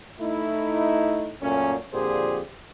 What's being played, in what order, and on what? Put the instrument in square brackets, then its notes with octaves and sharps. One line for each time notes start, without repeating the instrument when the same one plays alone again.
[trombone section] A3 D#4 E4
F#2 A#2 A3 C#4
F2 A#2 D3 G4 G#4 C5